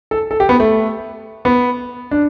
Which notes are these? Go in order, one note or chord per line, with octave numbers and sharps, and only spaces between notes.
A4
A4
G4
B3
A3
B3
D4